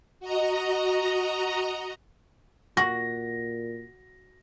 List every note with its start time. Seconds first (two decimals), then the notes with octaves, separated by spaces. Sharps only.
0.20 F#4 D#5 A#5
2.77 A#2 F#4 A#6